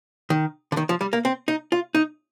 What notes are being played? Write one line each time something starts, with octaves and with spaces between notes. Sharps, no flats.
D#3
D3
D#3
F3
G3
A#3
C4
D#4
F4
D#4